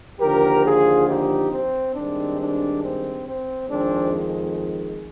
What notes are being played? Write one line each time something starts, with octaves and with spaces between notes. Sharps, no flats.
D#2 D3 F3 G4 A#4
F4 G#4
D#4 G4
C4
G2 D#3 G#3 C4 D4
D4
C4
C4
F2 D#3 G#3 C4 D4